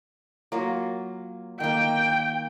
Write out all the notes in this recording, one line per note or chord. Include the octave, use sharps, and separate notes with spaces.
F#3 A#3 F4
D#3 A#3 G5